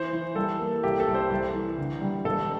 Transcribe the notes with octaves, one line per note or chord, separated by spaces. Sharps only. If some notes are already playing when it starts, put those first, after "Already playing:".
Already playing: E3 C5
E3
G3 A4
A#3
C2 G4
A4
C2
C5
C2
E3
D3
G3
E1 A4